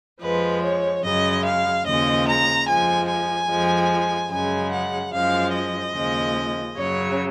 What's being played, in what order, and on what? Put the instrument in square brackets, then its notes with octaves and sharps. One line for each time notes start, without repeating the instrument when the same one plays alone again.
[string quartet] F2 F3 G#3 B4
C#5
F#2 C#3 G#3 D#5
F5
D#2 C#3 F3 G#3 D#5
A#5
F2 F3 G#3 G#5
G#5
F2 F3 G#3
F#2 C#3 G#3 G#5
F#5
F#2 F3 G#3 F5
D#5
D#2 C#3 F3 G#3
F#2 C#3 F#3 C#5